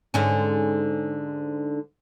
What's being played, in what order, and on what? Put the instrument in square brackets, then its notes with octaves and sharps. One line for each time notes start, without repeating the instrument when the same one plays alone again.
[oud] G#2 D3 C#4